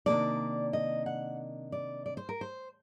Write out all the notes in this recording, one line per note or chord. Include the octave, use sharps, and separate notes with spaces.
C3 D#3 F#3 A#3 D4 D5
D#5
F#5
D5
D5
C5
A#4
C5